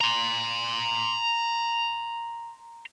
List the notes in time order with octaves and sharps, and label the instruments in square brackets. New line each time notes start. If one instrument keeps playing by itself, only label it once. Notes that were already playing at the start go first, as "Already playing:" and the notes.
[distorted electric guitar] A#5 C6